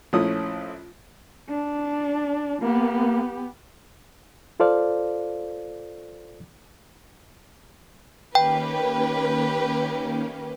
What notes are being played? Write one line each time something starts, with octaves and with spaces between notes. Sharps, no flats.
A#1 F3 A3 C#4 E4 D#6
D4
A#3 B3 G4
F4 A4 C5 D5 F5
D#3 A#3 C#4 G4 B4 G5